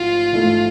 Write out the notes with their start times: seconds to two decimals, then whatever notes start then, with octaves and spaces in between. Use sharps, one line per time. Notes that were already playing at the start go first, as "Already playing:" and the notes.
Already playing: A1 G#2 F3 F4
0.33 A1 G#2 F3 A3 E4